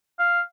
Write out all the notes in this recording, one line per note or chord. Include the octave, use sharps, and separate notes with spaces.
F5